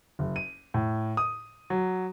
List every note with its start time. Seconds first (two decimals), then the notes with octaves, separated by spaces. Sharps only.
0.19 F#1
0.36 D#7
0.74 A2
1.17 D#6
1.70 F#3